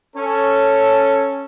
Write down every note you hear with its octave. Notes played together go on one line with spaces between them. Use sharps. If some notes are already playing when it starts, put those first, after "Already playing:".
C#4 A4